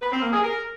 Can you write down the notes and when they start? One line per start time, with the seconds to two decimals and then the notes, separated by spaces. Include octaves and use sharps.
0.02 B4
0.12 C4
0.22 A#3
0.32 G#4
0.43 A#4